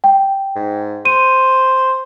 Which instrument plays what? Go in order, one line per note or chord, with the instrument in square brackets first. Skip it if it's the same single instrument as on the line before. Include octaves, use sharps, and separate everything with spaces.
[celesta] G5
[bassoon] G#2
[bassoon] C5 [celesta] D#7